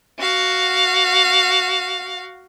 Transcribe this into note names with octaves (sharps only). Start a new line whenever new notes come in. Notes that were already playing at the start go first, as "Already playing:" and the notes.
F#4 F5